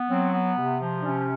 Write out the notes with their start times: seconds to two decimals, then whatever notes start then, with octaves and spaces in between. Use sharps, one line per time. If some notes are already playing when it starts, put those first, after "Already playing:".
Already playing: B3
0.08 F#3 C4
0.32 B3
0.57 C3
0.81 F3
1.01 D4
1.05 C3 C#4